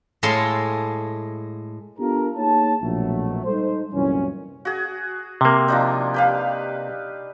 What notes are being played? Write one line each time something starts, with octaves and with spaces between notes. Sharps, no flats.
A2 G#3 A4 F5 A5 C6
B3 D4 F4 G4 A4 A#4
A#3 D#4 G#4 C#5 A5
A#1 B2 F#3 A3
G3 G#3 D#4 A4 C5
C2 F#2 A#2 E3 C#4
F#4 G#4
C3 A#3
F3 D4 D#4
G4 B4 F5